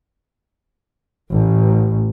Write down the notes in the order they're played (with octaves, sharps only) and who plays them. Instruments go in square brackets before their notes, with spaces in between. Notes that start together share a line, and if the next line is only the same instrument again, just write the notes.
[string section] A1